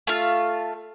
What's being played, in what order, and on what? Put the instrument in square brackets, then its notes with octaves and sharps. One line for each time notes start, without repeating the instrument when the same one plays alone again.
[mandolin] A3 F4